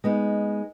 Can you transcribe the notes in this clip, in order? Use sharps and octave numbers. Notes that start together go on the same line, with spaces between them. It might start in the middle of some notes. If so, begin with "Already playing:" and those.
G#3 B3 D#4